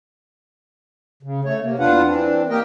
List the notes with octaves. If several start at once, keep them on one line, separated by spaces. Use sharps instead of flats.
C#3
A3 C#5
C3 A#3
E2 D4 F4 B4 F5 F#5
E3 C4 D4
A#3 G4 A#4 D#5 G5